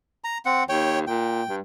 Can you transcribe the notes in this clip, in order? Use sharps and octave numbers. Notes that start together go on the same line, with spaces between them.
A#5
C4 F#5
D#2 C#5 G5
A#2 G5
G2